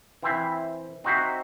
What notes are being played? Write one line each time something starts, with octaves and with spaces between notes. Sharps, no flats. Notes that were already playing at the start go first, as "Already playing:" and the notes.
E3 C4 E4 C5 E5
C4 D#4 F#4 C5 E5